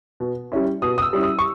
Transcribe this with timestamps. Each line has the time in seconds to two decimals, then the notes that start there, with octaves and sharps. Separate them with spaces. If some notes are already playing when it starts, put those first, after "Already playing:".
0.20 B2
0.52 G3 C#4 E4
0.82 B2 D#6
0.98 D#6
1.02 E6
1.13 G3 C#4 E4
1.23 D#6
1.39 C#6